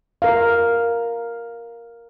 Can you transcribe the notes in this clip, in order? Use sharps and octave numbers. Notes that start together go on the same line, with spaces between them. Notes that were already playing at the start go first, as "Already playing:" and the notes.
A#4 F5